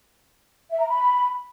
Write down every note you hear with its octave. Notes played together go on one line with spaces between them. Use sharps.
E5
A#5
B5